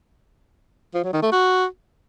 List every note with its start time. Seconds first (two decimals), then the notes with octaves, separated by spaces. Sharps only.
0.94 F3
1.04 F#3
1.13 D#3
1.23 A3
1.32 F#4